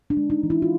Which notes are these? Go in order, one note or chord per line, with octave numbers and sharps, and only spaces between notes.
D4
G#3
D#4
E3
E4
F4